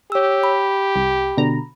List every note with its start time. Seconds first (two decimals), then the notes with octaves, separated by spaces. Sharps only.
0.12 G4 C#5 E6
0.43 B5
0.96 C2
1.37 B2 D3 A#5